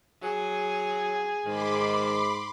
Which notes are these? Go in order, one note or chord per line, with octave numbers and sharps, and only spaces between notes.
F#3 G#4
G#2 D#3 B5 C6 D6